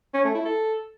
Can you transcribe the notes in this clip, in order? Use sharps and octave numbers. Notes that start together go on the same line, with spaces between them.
C#4
A3
E4
A4